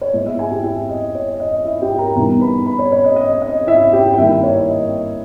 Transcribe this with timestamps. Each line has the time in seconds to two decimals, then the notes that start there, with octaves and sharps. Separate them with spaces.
0.01 C#5
0.13 A#2 G#3 B3 E4 D#5
0.26 E4 E5
0.39 G#4 G#5
0.51 G4 G5
0.63 E4 E5
0.89 D#5
1.15 C#5
1.40 D#5
1.65 E4 E5
1.82 G4 G5
1.98 A#4 A#5
2.15 E2 B2 G3 B3 D#4 A#4 A#5
2.41 B4 B5
2.66 B4 B5
2.79 C#5
2.92 C#5
3.04 D#5
3.16 D#5
3.42 D#5
3.67 E4 E5
3.93 G4 G5
4.13 G5
4.18 G2 D#3 A#3 E4 E5
4.43 C#5
4.68 D#5